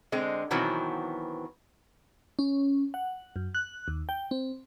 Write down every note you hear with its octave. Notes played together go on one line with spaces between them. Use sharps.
D3 G#3 C4
B2 D#3 E3 F#3 B3 C4
C#4
F#5
F#2
F#6
D#2
G5
C4